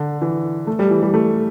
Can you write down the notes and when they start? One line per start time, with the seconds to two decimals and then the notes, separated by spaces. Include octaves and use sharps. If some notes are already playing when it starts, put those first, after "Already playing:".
Already playing: D3
0.22 E3
0.67 A3
0.79 G3
0.90 E3
1.02 G3
1.14 A3